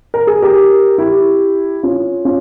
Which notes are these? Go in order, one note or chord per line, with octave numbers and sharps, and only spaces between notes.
A#4
G#4
G4 A#4
E4 G4
C#4 F4
C#4 F4